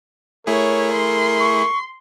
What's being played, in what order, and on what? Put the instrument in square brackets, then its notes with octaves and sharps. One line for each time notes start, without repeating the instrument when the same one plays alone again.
[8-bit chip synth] A3 E4 G#4 [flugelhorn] A#4 [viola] C#5
[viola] C6
[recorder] C#6